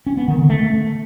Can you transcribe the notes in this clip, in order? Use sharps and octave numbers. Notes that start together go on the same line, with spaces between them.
C#4
B3
D#3
D3
A3